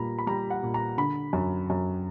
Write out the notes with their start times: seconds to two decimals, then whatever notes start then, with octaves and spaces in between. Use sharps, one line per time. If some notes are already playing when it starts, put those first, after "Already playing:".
Already playing: A#2 G3 A#5 B5
0.19 B5
0.27 G3 A#5
0.50 F#5
0.63 A#2
0.74 A#5
0.97 D3 B5
1.33 F#2
1.70 F#2